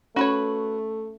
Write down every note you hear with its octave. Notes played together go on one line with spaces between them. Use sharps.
A3 C#4 F#4 B4 C#5